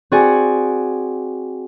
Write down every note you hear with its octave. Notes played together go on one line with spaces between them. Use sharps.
C4 F#4 G#4 D5 F#5 G#5